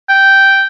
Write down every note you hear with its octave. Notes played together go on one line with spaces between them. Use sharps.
G5